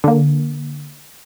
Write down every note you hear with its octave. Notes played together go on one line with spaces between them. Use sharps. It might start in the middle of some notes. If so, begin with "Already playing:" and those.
D3 A#3